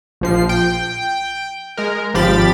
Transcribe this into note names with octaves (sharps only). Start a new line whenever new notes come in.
A#1 F3 C7
G5
G#3 A#4
G#1 F3 G4 B5 A6